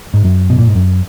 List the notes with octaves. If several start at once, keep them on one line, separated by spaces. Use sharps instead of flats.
G#2
F#2
B2
A#2
G#2
F#2